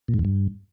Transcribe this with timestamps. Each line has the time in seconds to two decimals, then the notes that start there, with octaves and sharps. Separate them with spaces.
0.08 A#2
0.14 G#2
0.19 E2
0.25 G2